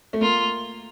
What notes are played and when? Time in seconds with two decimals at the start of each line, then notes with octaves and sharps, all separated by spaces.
0.13 A3
0.21 A#3 F4